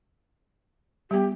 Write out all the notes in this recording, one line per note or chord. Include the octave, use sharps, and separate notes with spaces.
G3 B3 G4